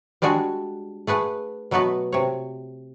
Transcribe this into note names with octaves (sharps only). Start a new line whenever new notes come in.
G3 G#3 D4 F#4 G#4
A3 G#4 B4 F#5
B2 F#3 A3 B3 F#4 B4
C3 C#5